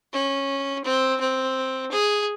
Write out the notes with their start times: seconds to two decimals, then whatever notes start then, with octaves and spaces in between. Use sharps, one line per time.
0.13 C#4
0.84 C4
1.20 C4
1.92 G#4